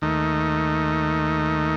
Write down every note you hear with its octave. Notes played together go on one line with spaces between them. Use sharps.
D#2 D#3 A3 D#4